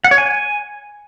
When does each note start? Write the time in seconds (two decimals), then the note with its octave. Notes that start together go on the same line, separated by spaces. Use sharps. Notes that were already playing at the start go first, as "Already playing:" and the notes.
0.04 F#5
0.11 C#5
0.18 G#5